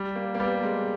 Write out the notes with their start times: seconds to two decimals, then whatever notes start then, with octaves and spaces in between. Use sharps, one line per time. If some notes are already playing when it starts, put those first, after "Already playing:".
Already playing: G3
0.16 A#3
0.34 A#3
0.40 G3 B3
0.63 G#3